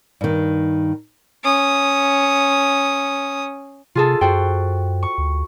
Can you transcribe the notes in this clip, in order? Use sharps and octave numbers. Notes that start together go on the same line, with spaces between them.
G2 D#3
C#4 D#6
C3 F4 G#4 A4
F#2 F#4 C5 G5
C#6
D2